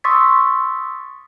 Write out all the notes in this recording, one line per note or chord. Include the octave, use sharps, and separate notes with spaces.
C6 C#6 D#6 E6 A6 B6